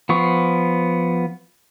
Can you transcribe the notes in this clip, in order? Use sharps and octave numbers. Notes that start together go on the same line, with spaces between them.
F3 B3 C#6